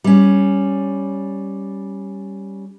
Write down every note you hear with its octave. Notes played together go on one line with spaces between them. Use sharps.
G3 C#4